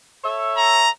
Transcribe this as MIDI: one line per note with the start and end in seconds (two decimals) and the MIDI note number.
0.23 0.86 69
0.23 0.86 73
0.23 0.86 76
0.57 0.90 82